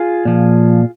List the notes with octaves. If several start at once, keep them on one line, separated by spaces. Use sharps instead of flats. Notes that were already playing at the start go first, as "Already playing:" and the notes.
Already playing: F4 G#4
A#2 F3